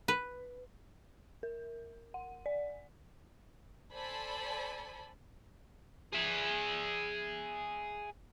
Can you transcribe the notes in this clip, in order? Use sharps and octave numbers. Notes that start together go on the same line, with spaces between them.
B4
A#4
F#5
D5
A4 C5 D5 G#5 A5 B5
G#4 E5